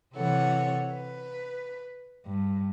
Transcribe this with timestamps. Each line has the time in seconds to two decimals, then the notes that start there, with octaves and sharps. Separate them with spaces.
0.15 C3 E3 A4 C#5 F#5
0.95 B4
2.26 G2